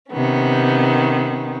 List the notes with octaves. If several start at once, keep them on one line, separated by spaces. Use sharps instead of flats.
C3 D#3 B3 C#4